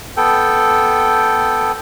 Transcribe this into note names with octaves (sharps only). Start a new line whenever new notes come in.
B3 A4 G5